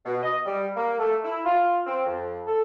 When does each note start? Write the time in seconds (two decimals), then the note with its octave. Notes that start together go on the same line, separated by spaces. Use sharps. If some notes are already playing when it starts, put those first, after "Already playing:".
0.05 B2
0.23 D#5
0.46 G3
0.77 A#3
0.99 A3
1.24 E4
1.45 F4
1.86 C4
2.06 F2
2.46 A4